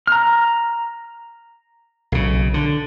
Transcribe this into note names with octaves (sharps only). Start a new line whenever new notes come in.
A#5 F6
B1 C#3
D3